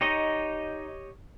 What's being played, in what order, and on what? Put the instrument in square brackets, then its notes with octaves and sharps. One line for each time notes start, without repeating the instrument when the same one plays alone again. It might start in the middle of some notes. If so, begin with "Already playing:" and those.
[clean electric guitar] D#4 [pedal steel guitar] G4 C#5 D#5